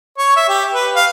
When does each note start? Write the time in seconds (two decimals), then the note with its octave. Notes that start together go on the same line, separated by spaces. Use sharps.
0.18 C#5
0.36 E5
0.49 G4
0.73 B4
0.96 F5